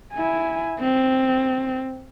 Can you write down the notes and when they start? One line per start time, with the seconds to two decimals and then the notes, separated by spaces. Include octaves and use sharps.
0.14 E4 G#5
0.80 C4